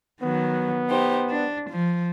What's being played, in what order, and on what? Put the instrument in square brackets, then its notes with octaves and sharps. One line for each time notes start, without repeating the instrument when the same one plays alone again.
[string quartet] D#3 F#3 [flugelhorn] B3
[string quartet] D#4 G4 C5
D4
F3